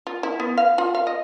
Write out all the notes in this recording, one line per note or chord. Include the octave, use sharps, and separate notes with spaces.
F4
E4
B3
F5
F4
F5
D#5